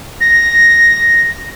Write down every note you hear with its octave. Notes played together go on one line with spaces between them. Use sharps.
A#6